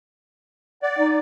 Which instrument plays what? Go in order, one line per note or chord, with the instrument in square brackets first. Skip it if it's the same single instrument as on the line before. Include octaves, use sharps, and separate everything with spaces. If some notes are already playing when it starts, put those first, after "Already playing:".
[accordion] D5 [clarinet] F#5
[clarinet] D#4